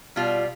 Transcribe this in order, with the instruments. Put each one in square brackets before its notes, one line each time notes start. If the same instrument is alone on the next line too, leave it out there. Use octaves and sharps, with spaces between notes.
[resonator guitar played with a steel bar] B2 G3 F4